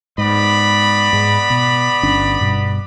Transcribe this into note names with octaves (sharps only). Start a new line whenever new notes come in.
G#2 B3 D5 B5
G#2 G#3
B2
G1 C#4 D4
G2 B2